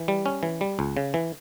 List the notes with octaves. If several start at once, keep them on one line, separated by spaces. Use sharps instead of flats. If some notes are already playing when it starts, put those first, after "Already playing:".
Already playing: E3
G3
C#4
E3
G3
C#2
C#3
E3